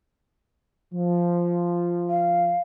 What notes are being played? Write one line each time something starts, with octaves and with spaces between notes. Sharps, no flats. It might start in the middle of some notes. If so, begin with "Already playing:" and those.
F3
F5